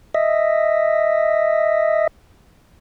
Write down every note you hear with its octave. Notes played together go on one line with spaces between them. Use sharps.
D#5 E5